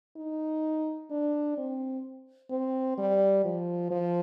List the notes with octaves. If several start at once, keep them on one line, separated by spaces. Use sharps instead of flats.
D#4
D4
C4
C4
G3
F3
F3